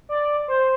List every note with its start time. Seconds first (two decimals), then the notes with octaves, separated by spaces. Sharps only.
0.09 D5
0.48 C5